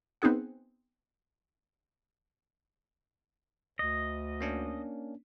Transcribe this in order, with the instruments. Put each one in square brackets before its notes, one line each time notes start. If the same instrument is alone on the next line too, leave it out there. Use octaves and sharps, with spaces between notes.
[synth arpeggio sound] B3 C4 D#4 G#4 F#5
[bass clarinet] D2 [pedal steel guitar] D#5
[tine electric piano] A#3 C#4 D4